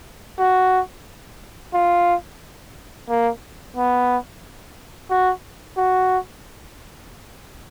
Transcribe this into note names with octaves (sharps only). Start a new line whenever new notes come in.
F#4
F4
A#3
B3
F#4
F#4